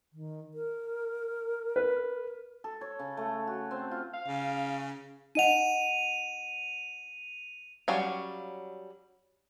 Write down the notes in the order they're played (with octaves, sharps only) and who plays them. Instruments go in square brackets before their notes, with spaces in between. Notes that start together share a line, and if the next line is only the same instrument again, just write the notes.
[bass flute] D#3
A#4
[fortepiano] B4
[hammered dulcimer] A4
C#5
C#3
A3
F#4
C4
F4
[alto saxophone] F5
[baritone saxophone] C#3
[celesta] D#4 D#5 F#5 [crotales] D#7 F7
[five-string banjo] F#3 G3 C#4 F5